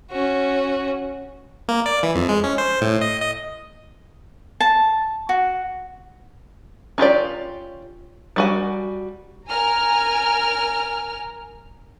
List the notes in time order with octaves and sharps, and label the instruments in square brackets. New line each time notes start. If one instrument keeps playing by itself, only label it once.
[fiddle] C#4 F#4
[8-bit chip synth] A#3
D5
E3
F2
G#3
C#4
C5
A2
D#5
D#5
[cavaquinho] A5
F#4
[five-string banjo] C#4 F4 G4 D5
G3 F#4 G#5
[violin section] A#4 G#5 A#5 F6